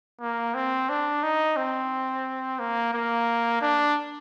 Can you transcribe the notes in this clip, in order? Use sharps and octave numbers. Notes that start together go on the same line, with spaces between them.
A#3
C4
D4
D#4
C4
A#3
A#3
D4